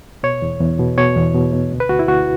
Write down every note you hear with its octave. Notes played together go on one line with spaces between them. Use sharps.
B2 C#5
E2
E2
B2
B2 C#5
E2
B2
B2
D2
B4
D2 F#4
E4
D2 F#4